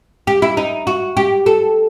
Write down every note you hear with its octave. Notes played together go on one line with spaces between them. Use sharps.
G4
E4
D#4
F#4
G4
A4